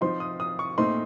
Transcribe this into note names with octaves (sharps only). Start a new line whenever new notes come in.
F3 C4 D#4 C6
D#6
D#6
C#6
A#2 A3 C4 D#4 C6